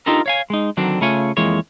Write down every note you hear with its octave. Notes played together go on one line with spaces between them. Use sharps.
D4 D#4 F4 G4 A4 A#4
C#5 F5 G#5
G#3 D#4
D3 D#3 F#3 C4 D4
C#3 A3 F4 C#5 G#5
F2 E3 G#3 A#3 C#5